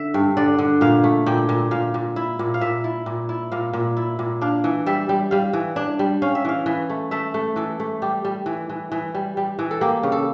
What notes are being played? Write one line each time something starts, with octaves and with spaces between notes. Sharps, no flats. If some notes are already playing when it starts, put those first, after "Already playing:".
Already playing: D3 E5
G2
D3 D5
D3
A#2 F5
A3
A#2 G5
A#2
A#2 F5
A#2
E4
A#2
F5
A#2 E5
E4
A#2
E4
A#2 F5
A#2
E4
A#2
D4 F5
E3
G3 E5
G3
G3 F5
E3
D4
G3
C#4 F5
E5
E3 F5
E3
A3
A3 E5
A3
E3 A4
A3
G3 G4
G3
E3
E3
E3
G3
G3
E3
A4
A#3 G4
C#3
A4